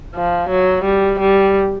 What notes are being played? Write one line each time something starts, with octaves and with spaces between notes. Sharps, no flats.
F3
F#3
G3
G3